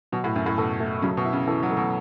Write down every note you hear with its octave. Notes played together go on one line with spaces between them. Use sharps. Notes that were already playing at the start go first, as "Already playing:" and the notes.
B2 F#3
A2
F#2 E4
A2
B2 A4
A3
C#3 F#3
B2
E4
C#3
E3 A4
F#3
A3
B2